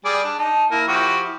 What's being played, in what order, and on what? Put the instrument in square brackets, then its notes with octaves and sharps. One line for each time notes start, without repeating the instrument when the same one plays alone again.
[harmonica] G3 G#4 D5
D4
[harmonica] D#4 [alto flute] A5
[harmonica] A#3 [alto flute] E4
[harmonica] F3 F#4 G4